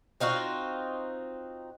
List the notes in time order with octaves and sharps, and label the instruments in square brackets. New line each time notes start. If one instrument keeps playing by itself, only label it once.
[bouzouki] C4 D#4 F4 F#4